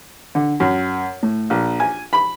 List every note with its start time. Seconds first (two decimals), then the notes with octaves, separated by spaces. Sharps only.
0.35 D3
0.60 F#2
1.23 A2
1.50 A#1
1.80 G#5
2.13 B5